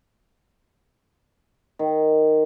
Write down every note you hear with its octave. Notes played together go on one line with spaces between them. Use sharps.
D#3